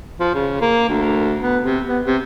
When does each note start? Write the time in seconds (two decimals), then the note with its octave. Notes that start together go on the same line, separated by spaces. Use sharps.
0.20 F3
0.34 C#3
0.61 A#3
0.89 D2
1.41 B3
1.64 C3
1.88 B3
2.06 C3